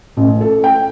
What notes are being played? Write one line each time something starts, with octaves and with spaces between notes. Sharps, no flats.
A1
A4
G5